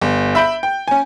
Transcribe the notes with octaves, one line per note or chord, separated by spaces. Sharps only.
G1
E5 B5 G6 D7
G5
C#4 G#5